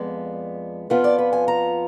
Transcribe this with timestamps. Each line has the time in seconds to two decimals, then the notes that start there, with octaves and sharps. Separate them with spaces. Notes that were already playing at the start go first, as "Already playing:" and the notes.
Already playing: F2 F3 G#3 B3 D5
0.90 F2 F3 B3 F4 B4
1.04 D5
1.19 B4
1.33 G#5
1.48 A#5